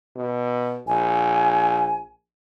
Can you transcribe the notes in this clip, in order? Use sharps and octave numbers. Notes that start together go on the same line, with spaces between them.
B2
A#1 G#5